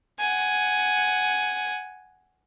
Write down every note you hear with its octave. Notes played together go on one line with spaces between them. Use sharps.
F#5 G#5